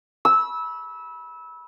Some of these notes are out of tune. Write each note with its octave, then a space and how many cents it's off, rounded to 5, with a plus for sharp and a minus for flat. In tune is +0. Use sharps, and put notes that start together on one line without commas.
B5 -25 E6 -20